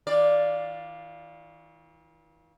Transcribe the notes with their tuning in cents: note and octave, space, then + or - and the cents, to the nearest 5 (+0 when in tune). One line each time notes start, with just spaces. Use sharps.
E3 -45 F4 +0 D5 +0